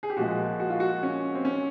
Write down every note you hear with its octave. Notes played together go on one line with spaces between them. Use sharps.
G#4
G4
A#2 F3 G#3 F#4
F#4
F4
F#4
C#4
C4
C#4